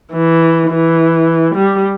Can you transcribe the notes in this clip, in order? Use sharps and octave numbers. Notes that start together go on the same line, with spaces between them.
E3
E3
G3